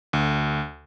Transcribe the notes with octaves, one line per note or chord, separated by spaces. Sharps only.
D2